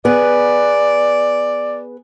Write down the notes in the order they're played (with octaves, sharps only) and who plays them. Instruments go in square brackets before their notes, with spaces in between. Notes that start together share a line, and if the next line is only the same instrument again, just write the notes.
[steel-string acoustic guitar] B3 G#4 B4 [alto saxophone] D5